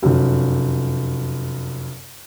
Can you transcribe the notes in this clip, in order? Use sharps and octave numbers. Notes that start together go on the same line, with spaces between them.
F1 F#2